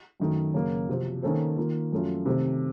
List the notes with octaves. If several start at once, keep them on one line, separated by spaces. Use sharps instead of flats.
F#2 D#3 A3
F#2 C#3 F#3 A#3
C3 F3 C4 F#4 C5
D#3 A#3 C#4 A4 C5
D#3 A#3 F4
F#2 F3 A3 C#4 F4
C3 D#3 A3 C4